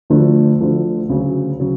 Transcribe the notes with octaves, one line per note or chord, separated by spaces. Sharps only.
D2 D3 F3 A3 D4
D2 D3 F3 A3 D4
D2 C#3 F#3
C#3 F#3